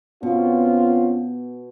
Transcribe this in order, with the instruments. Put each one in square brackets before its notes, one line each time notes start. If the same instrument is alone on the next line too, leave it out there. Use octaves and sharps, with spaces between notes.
[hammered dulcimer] B2 [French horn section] C4 C#4 F4